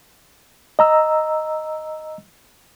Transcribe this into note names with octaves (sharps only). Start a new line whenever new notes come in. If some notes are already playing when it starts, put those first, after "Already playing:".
D#5 A#5 E6